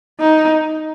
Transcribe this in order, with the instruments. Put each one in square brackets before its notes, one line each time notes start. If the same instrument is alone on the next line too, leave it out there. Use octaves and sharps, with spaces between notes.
[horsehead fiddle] D#4